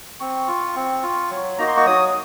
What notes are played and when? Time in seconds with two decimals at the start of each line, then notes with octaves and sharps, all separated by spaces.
0.20 C4 C#6
0.48 F4
0.76 C4
1.03 F4
1.31 F#3
1.58 A#3 D#4 F#4 A#5
1.67 C6
1.77 C#6
1.86 F#3 D#6
2.09 D#6